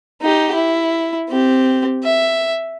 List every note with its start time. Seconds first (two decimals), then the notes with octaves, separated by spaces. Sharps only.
0.22 D#4 G4
0.55 E4
1.29 C4 G4
2.04 E5